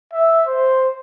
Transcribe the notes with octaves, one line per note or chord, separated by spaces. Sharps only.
E5
C5